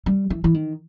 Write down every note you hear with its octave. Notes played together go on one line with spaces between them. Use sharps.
G3
E3
E3
D#3